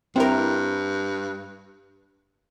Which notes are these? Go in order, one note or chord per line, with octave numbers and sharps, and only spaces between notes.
G2 C4 E4 A#4